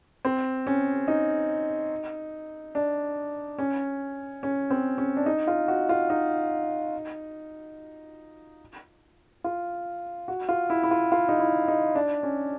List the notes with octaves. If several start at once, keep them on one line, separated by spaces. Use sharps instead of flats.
C4
C#4
D#4
D4
C#4
C#4
C4
C#4
D4
D#4
F4
F#4
F4
D#4
F4
F#4
F4
E4
E4
F4
F4
D#4
E4
D#4
D4
C#4